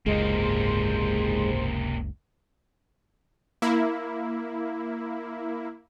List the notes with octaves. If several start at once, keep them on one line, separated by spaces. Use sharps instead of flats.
F#1 C#2 G#2 C3 G#3 A#3 C5
A#3 E4